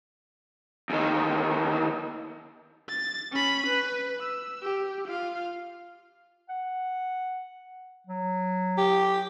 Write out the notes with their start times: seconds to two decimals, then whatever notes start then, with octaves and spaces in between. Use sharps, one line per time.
0.90 E2 D#3
2.89 A6
3.32 C#4 B5
3.67 B4
4.20 E6
4.63 G4
5.08 F4 F5
6.49 F#5
8.07 F#3
8.78 G4